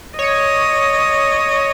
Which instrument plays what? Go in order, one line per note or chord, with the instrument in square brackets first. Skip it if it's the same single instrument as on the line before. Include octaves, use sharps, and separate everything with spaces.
[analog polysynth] C#5 [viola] D#5